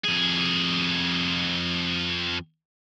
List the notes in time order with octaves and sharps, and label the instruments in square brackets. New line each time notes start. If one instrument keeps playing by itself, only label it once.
[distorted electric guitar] F2 G#4